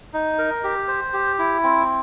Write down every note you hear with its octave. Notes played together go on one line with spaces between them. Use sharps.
D#4
A#4
G4
C5
G4
E4
C4